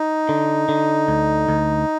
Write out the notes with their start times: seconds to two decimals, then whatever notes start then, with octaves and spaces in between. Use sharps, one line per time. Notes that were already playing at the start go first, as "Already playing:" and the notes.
Already playing: D#4
0.29 D3
0.69 D3
1.08 D2
1.49 D2